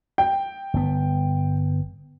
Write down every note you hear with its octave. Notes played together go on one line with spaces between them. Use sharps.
G5
G1 B3